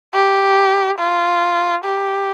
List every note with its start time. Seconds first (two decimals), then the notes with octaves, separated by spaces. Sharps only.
0.14 G4
0.99 F4
1.85 G4